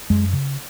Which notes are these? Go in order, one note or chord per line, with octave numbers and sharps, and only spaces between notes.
F#2 G#3
C#3